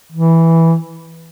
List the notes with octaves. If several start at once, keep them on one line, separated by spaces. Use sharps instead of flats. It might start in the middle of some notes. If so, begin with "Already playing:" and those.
E3